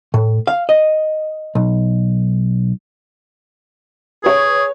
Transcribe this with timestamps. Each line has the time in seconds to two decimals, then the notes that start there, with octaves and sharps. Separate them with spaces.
0.14 A2
0.47 F5
0.69 D#5
1.55 B1
4.24 G#4 B4 C#5